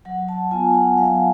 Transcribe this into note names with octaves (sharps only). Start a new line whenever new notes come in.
F#3 F#5
A5
B3 F4 G#5
F#5
F#3 F5